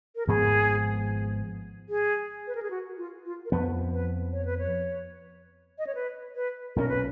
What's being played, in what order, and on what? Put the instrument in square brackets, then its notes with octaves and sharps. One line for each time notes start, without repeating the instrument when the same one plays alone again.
[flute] A#4
[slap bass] G#1 G#2 F3 B3 [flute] G#4
[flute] G#4
B4
A#4
G#4
F#4
F4
F4
A#4
[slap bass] F2 F3 B3 [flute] B4
[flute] B4
C#5
B4
C#5
D#5
C#5
B4
B4
[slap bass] B1 A#2 F#3 C#4 [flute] A#4
[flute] B4